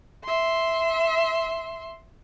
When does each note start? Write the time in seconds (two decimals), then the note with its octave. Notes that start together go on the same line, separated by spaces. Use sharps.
0.24 E5 C6